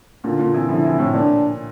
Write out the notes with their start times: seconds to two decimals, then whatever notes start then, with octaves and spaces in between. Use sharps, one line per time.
0.24 A#2 D3 F4
0.39 A#2 D3
0.54 C3 E3
0.69 D3 F3 E4
0.84 C3 E3
0.99 A2 C3
1.13 A#2 D4